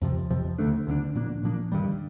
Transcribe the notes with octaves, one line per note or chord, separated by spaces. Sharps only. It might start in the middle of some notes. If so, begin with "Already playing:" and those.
F2 C3 F3
F2 C3 F3
D2 D3 A3 D4
D2 D3 A3 D4
A#2 F3 A#3 D4
A#2 F3 A#3 D4
G2 D#3 G3